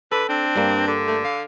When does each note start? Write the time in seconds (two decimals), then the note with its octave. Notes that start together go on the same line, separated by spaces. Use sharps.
0.12 D3 A4 B4
0.29 C4 D4
0.56 G2 G3 A#3
0.88 D3
1.07 A3
1.24 F5